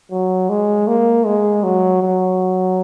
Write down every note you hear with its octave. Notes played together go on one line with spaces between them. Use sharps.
F#3
G#3
A#3
G#3
F#3
F#3